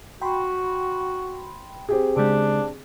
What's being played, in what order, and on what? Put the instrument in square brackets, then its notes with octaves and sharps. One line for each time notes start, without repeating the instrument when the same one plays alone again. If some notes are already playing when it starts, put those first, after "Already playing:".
[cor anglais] F#4 [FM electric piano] G5 B5 C6
[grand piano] C4 G4 G#4
[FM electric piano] C#3 G#3 [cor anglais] D4